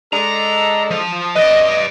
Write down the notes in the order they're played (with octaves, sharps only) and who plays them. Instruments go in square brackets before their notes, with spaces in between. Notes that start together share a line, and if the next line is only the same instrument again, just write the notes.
[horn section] G#3 D4 A4 [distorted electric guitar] A#5
[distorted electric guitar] F3
[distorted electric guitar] B4 D5 [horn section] D#5